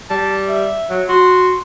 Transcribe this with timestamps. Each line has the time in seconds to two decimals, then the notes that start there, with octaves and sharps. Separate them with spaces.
0.10 G3 A5
0.48 E5
0.90 F#3
1.09 F#4 C6